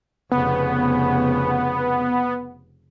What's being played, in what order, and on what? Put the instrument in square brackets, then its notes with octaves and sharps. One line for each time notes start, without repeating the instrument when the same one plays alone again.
[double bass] F1 C#3 [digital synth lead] B3